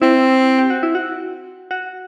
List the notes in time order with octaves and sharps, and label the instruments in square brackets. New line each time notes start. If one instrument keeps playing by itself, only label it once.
[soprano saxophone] C4 [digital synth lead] E4
[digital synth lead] G4
F#4
E4
F#4
F#4